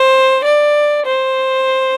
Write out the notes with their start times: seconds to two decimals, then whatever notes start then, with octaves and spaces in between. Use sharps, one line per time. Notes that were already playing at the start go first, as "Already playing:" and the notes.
Already playing: C5
0.44 D5
1.04 C5